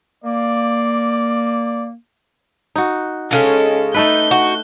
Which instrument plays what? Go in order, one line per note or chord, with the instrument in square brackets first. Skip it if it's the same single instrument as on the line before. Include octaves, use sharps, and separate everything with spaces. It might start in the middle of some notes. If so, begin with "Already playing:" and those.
[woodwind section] A#3 [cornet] D5
[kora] D#4 F#4
[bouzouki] C#3 E3 G#3 [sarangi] C#4 [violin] A4
[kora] A3 A4 B4 [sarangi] D#4 [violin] G6
[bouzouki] F#4